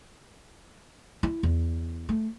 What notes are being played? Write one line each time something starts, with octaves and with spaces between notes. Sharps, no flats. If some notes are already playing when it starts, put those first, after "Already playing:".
E4
E2
A3